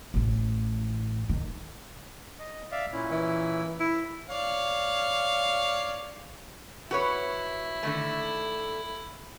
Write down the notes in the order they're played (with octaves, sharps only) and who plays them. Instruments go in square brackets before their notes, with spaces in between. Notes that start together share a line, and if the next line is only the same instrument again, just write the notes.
[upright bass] A1 A2
D#3
[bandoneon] D#5
D5 E5 F5
A#2 C#4 E4
[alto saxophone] E3
E4
[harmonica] C#5 D5 F5
[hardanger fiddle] E4 [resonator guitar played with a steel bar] F#4 B4 C#5
[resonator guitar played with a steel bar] D3 D#3 A3